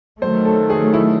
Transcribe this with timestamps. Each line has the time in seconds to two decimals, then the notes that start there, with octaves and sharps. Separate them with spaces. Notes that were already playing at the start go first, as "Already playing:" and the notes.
0.22 D#3 F#3 A3 C5
0.45 A4
0.70 G#4
0.93 E4